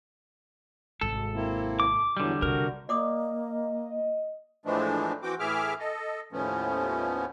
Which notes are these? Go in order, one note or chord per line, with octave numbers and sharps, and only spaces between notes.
G#1 C3 A4
A#3 C4 E4
D6
E2 D3 E3 F#3 G3
C3 F#4 A#4
A#3 D5 D#5 D6 D#6
A2 E3 F3 G#3 A3 D4
E3 C4 F#4 G5 D6
A2 E3 G#4 E5 D6 F6
A4 D#5
D#2 A2 F3 A3 B3 C#4